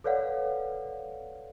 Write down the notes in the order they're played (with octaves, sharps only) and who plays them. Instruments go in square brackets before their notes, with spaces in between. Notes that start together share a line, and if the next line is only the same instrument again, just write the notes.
[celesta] A4 B4 C#5 D5 F5 F#5